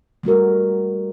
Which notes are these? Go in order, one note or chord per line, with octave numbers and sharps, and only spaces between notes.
G3 A3 F#4 A#4